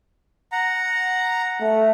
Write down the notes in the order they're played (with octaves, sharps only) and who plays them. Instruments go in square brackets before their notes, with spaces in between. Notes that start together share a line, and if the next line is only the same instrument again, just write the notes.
[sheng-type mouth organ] F#5 A#5
[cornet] A3